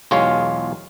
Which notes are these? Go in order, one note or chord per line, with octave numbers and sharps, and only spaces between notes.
B1 E2 G#3 F4 C#5 F5